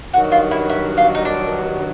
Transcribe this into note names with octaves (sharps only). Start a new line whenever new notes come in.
G2 D#3 F#3 F#4
F4
E4
E4
F4
D#4
D4